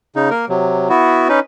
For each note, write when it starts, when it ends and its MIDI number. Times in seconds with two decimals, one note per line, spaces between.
0.16 0.30 49
0.16 0.30 63
0.31 0.45 58
0.31 0.45 70
0.49 0.88 48
0.49 0.88 54
0.89 1.28 59
0.89 1.28 64
0.89 1.28 66
1.29 1.40 61
1.29 1.40 63
1.29 1.40 71